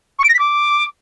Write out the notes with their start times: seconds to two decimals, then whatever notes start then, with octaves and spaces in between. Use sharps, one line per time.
0.18 C#6
0.23 D7
0.28 A#6
0.34 B6
0.39 D6